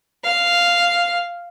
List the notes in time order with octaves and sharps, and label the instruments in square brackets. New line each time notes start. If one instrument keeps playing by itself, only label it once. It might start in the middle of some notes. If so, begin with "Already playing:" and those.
[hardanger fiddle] F5